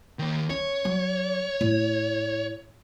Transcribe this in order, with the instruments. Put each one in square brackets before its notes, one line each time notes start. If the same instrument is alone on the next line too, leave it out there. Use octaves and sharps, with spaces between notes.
[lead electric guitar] D#3 A#3
[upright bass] C#4 [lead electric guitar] C#5
[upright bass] F#3
A2